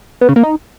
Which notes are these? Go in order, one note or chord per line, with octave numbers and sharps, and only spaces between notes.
B3
C#3
A#3
D#4